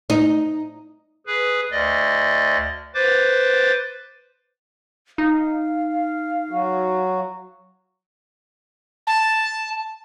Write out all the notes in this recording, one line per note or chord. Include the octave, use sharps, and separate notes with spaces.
D#4
G#4 B4
D2 D5 D#5
B4 C5 D6 A6
D#4 F5
F#3 F#4
A5